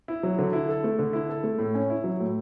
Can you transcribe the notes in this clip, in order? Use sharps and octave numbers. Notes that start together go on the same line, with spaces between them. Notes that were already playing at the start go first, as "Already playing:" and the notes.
E4
F#3
D3
E4
A4
A3
D3
E4
A4
A3
A2
C#4
E4
F#3
A2